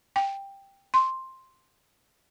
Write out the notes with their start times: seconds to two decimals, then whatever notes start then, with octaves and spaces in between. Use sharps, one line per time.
0.16 G5
0.94 C6